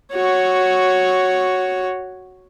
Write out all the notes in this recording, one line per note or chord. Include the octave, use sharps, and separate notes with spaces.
F#4 C#5